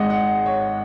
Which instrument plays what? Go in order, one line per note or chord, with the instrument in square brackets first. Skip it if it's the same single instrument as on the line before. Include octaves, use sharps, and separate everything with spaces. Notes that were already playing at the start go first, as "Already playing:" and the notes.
Already playing: [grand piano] G#1 G#2 G#3 D#5 F#5
F#5
C#5